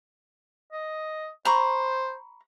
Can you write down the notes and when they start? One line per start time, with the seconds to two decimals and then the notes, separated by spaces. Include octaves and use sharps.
0.72 D#5
1.45 C5 A#5 B5 C#6